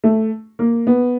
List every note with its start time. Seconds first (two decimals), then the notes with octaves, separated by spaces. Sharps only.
0.04 A3
0.59 A#3
0.87 B3